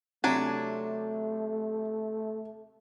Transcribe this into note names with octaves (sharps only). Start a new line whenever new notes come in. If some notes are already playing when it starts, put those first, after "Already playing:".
C3 F#3 A3 D4 G#5